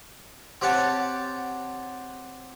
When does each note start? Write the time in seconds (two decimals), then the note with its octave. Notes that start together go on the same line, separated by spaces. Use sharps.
0.62 C4 G4 C#5 F#5 A5